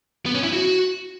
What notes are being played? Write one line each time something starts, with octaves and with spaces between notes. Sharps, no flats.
B3
C#4
E4
F#4